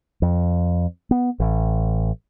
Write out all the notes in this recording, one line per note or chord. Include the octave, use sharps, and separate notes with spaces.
F2
B3
A1